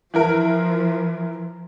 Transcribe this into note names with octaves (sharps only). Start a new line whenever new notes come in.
E3 F3 E4 A#4